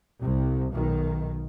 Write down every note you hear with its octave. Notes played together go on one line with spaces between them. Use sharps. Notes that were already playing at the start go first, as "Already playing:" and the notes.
C2 C3
B1 B2 D#3